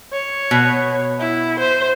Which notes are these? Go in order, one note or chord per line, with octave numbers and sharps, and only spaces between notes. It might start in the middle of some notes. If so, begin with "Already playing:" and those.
C#5
B2
E4
C5